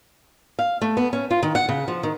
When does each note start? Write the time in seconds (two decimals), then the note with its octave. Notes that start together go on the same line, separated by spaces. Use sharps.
0.59 F5
0.82 A3
0.97 B3
1.13 C#4
1.31 F4
1.43 D#3
1.55 F#5
1.69 C#3
1.88 F3
2.03 D#3